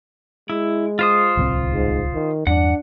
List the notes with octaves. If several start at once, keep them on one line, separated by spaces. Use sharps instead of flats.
G#3 E4
F4 C5 D#6
D1 C2 C4
G#2
D#3
E2 G2 D4 F#5